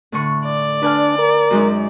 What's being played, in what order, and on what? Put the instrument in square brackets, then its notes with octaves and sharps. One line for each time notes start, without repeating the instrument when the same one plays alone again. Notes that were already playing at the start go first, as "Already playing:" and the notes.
[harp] A2 D3 C#6
[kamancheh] D5
[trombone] D4 [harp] B4 G#5 F6
[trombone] A#4
[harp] F#2 G#3 D#4